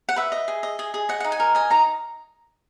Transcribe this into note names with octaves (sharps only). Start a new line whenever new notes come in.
F#5
B4 E5
D#5
G#4
D#5
G#4
G#4
D#5 F#5
D#4 F#5
G#5
A#4
D#5 G#5
D#4 A#5